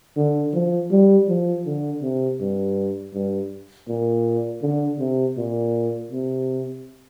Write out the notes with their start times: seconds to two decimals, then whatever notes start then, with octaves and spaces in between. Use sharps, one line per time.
0.16 D3
0.54 F3
0.91 G3
1.28 F3
1.66 D3
2.02 C3
2.40 G2
3.13 G2
3.89 A#2
4.62 D3
4.99 C3
5.37 A#2
6.11 C3